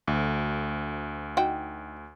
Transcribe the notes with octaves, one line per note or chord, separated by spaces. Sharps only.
D2
D#4 F#4 G5